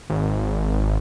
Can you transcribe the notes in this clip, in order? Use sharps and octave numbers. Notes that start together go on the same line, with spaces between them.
G#1